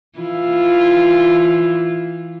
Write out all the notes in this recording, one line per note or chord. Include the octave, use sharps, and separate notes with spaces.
E3 E4 F4